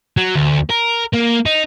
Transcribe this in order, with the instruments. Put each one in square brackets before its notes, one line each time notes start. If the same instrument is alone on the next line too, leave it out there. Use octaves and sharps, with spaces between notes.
[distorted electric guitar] F#3
D2
A#4
A#3
D#4